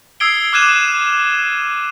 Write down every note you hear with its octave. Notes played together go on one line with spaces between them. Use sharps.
D#6 E6 G#6 C7 D7 G7
D6 F6 F#6 G#6 D#7 E7